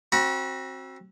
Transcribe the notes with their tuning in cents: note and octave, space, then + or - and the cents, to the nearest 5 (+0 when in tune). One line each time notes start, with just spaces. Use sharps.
C4 +20 F#4 +0 B5 -40